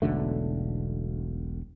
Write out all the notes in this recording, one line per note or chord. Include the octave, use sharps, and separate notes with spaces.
E1 B1 D3 A3